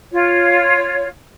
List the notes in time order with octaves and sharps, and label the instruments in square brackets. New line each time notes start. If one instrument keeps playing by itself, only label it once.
[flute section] F4 C#5